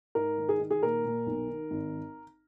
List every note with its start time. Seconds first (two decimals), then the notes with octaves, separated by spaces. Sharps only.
0.15 G#2 A#4
0.38 D#3
0.49 G#4
0.60 D#3
0.71 G#4
0.82 A#2 A#4
1.05 A#2
1.26 B1
1.48 D#3
1.71 G#1